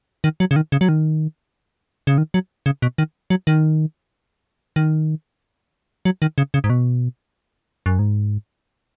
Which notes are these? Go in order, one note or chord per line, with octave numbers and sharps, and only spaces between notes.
D#3
F#3
C#3
D#3
C#3
F#3
D#3
C#3
D#3
F#3
C#3
B2
D#3
F#3
D#3
D#3
F#3
D#3
C#3
C#3
G#2
B2
F#2
G#2